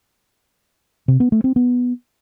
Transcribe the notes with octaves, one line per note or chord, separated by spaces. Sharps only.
C3
B3
A3
C4
B3